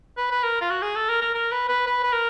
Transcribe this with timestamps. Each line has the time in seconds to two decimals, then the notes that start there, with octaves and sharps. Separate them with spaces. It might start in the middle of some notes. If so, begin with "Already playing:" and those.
0.17 B4
0.31 B4
0.44 A#4
0.61 F4
0.70 F#4
0.82 G#4
0.96 A4
1.09 A#4
1.22 A#4
1.34 A#4
1.52 B4
1.69 B4
1.87 B4
2.03 B4
2.13 A#4